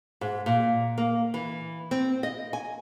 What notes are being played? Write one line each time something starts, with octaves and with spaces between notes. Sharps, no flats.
G#2
A#2
A#3
E3
C4
D#5
G#5